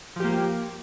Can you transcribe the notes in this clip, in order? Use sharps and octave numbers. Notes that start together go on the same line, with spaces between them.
F3 A#3 G4